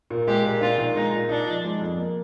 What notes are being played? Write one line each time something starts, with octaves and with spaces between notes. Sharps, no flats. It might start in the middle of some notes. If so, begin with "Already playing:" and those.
A#2
G#3 G4
A#2
D4 F4
D#3
G#3 D#4
A#2
D4 D#4
F3
G#3
F2
A#3